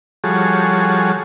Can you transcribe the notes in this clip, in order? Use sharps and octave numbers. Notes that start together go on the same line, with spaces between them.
F3 G3 F#4 G#4 A4 C#5